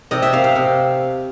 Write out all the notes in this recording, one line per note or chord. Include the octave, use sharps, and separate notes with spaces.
C3 D#5
E5
C3 F5
F5
C3